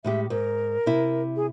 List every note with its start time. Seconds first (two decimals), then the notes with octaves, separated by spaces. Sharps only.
0.04 A2 G#3 G4 E5
0.30 G#2 A#4
0.86 C3 E4
1.36 G#4